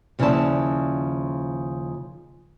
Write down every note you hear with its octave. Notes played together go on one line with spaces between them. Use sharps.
D#2 C#3 F3 E4 D5 A5